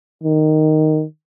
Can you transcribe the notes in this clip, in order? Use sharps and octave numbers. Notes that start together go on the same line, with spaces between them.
D#3